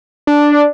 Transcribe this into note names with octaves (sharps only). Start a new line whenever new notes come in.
D4